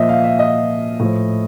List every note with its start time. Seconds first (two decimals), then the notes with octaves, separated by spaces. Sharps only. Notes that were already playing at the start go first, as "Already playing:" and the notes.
Already playing: A#2 F3 D#5 E5
0.09 F5
0.24 E5
0.39 D#5
0.99 A2 F3